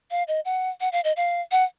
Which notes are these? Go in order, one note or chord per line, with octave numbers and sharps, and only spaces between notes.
F5
D#5
F#5
F#5
F5
D#5
F5
F#5